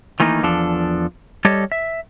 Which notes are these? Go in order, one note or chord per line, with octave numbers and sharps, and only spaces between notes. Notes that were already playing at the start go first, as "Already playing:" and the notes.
D#3 E3 A3 A#3 D#4
E2 F3 D4 A4
G3 G4 A4 C#5 D#5
E5